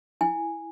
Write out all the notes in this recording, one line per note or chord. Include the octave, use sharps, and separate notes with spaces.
E4 G#5